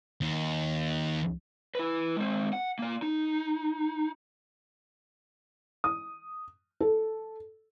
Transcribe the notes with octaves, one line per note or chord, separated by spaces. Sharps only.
D#2
E4 B4
G#3 C4
F#5
A#3 D5
D#4
D#6
A4